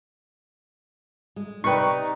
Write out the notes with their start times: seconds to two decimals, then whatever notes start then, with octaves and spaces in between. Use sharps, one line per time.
1.36 G#3
1.64 C3 G3 D#4 B4 G5 C#6